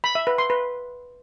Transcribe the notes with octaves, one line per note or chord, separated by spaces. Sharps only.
B5
E5
B4
C6
B4